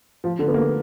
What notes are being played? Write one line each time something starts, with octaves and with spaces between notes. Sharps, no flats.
F3
D3
B3
A#3